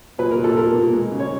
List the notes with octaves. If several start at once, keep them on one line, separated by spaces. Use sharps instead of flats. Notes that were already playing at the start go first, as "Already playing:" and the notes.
A#2 B4
A#4
A#2
A4
A#2 A#4
A#2
G#3
C#3
C#5